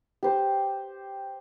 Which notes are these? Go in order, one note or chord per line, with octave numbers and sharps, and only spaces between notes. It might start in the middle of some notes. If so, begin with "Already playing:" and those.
G4 C5